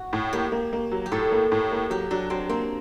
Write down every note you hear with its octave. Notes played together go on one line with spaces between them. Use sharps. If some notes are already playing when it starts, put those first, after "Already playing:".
Already playing: F#4
A2
A#3 G4
A#3
A#3
F#3
G4
A2 A4
A#3
A2
A#3
F#3 G4
F#3 D4
F#3 C4
A#3 C4